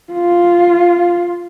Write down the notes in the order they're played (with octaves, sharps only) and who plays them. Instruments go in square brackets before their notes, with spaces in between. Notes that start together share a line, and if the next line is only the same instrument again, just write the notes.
[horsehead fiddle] F4